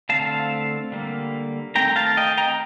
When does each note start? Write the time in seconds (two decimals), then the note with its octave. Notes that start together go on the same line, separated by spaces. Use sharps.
0.09 D3 A3 C4 F5 A5
0.92 D3 G3 A#3
1.75 D#3 A3 C4 G5 A#5
1.96 F5 A5
2.17 D#5 G5
2.37 G5 A#5